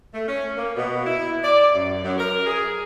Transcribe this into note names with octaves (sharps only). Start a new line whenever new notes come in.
A3
C#4
A#3
B2
E4
D5
F#2
F#2
A#4
G#4